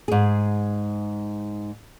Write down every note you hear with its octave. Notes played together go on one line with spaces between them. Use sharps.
G#2 G#4